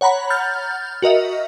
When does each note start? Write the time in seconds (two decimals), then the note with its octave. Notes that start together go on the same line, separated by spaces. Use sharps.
0.01 C#5 F#5 A#5 B5
0.30 F6 G6 A6
1.02 F#4 A#4 D#5 E5